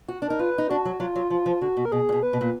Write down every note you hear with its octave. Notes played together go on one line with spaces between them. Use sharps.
F#4
D4
D#4 A#4
F4 B4
D#4
D4 F#4
F#3
F#3 F4
F#3
F3 F4
F3
D3 F#4
B2
A#4
B2 G#4
A#2
B2
B4
B2
A#2